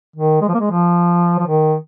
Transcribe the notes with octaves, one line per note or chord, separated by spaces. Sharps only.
D#3
G#3
F3
A#3
G#3
F3
F3
D#3